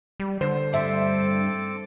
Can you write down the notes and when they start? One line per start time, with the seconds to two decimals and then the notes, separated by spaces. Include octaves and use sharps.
0.20 G3
0.41 D3 C5
0.73 D2 G2 C4 A4 E5 D6